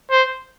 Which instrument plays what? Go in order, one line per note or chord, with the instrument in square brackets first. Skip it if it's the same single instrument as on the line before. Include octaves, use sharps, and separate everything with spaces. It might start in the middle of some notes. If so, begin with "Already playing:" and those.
[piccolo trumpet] C5